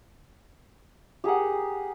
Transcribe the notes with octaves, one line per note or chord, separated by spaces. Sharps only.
G4 G#4 A#4 F#5